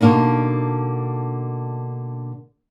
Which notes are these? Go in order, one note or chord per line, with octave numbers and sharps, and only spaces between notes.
B2 D3 A#3 D4 D#4